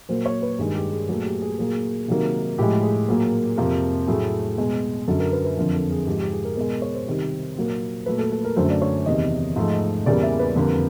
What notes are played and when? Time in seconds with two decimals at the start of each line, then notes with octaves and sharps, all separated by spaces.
0.09 A#2 F#3 A#3 C5
0.26 C#5
0.42 B4
0.59 G2 D#3 G#3 G#4
0.75 G4
0.92 G#4
1.09 A#2 F#3 A3 G#4
1.25 G4
1.42 G#4
1.58 A#2 F#3 A#3 G#4
2.08 C3 D#3 F#3 A#3
2.58 A2 F3 G#3 G4
2.83 G#4
3.09 A#2 F#3 A#3
3.57 F2 C3 F3 A#3
4.07 A2 F#3 A3 G#4
4.58 B2 G#3
5.08 F#2 D3 F#3 A4
5.20 A#4
5.32 B4
5.44 B4
5.57 F2 D3 F3 A#4
5.74 A4
5.91 G#4
6.07 G#2 F3 G#3 G4
6.20 G4
6.32 G#4
6.45 A#4
6.57 B2 G#3 A#4
6.82 C#5
6.94 C5
7.07 C3 D#3 G3
7.57 A#2 F#3 A#3
8.06 A#2 F#3 A3 B4
8.19 A4
8.32 A4
8.44 A#4
8.56 F#2 D3 F#3 A3 C5
8.70 D5
8.82 C#5
9.06 E2 C3 D#3 D#5
9.56 G#2 F3 A3
10.06 E2 C#3 E3 G3 A#3 D5
10.23 E5
10.39 B4
10.56 F2 D3 G3 A#3